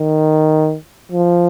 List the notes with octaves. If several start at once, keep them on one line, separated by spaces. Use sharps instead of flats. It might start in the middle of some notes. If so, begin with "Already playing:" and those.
Already playing: D#3
F3